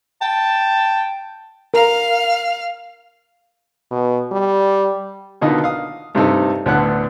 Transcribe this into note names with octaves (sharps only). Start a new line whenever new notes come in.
G5 A5
A#4 F5 F6
B2
G3
B2 D3 D#3 B3 F4 D#5
F5 D#6
G2 C3 C4 D#4 A4
D2 A2 D3 B3 F#5 F#6